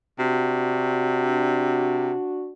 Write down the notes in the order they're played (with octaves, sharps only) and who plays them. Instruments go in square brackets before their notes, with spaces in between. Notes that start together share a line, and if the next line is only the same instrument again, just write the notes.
[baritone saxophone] C3 [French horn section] D4 F#4